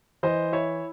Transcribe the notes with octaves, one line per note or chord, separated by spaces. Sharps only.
E3 C5 D#5
E4 C#5 E5